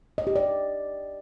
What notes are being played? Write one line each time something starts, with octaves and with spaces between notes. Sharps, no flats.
D#5
G4
D5